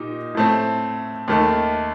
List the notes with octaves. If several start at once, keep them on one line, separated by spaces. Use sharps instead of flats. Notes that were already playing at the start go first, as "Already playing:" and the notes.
Already playing: A#2 D#4 G4
A2 A3 C4
D#2 D#3 A3